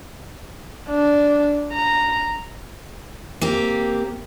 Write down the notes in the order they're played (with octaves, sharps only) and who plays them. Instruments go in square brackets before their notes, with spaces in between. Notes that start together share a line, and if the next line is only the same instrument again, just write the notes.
[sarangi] D4
A#5
[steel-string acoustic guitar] A#3 C4 G4